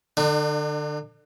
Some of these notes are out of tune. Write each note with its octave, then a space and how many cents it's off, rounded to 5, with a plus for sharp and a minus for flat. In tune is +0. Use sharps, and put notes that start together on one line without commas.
D3 +25 D#4 -45